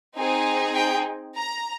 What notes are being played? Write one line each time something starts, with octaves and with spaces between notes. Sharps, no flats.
C4 D#4 G#4
G5
A#5